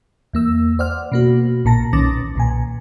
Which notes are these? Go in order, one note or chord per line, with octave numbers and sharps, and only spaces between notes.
E2 A#3 E6
C5 D5 F#5 F6
B2 A#3 F#4
A#1 A#2 A5 A#6
B1 D#3 C#4 D6 A6 A#6
B1 A#2 G#5